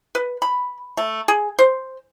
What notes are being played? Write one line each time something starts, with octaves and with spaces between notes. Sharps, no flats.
B4
B5
A3
G#4
C5